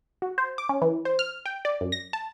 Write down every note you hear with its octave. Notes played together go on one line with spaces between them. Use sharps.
F#4
C5
D6
C#4
E3
C5
F6
G5
D5
F#2
A#6
A5